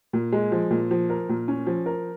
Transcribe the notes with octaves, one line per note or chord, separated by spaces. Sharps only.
A#2
G#3
F3
A#2
F3
A#4
A#2
C#4
F3
A#4